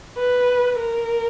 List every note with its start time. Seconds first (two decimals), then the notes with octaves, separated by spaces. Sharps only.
0.17 B4
0.79 A#4